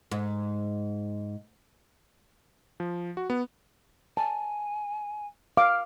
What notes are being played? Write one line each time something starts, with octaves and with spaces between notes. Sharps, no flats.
G#2
F3
F#4
B3
G#5 A5
F5 D6 F6